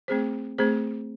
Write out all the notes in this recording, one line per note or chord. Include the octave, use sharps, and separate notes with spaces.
A3 C4 G#4 C5
A3 C4 G#4 C5